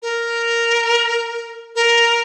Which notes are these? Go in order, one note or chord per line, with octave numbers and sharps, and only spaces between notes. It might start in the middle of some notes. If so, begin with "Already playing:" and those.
A#4
A#4